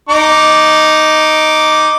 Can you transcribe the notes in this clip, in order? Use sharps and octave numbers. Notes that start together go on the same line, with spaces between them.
D#4 D6